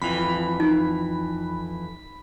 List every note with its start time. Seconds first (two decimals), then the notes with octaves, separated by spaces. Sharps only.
0.02 F2 E3 B5
0.60 D#4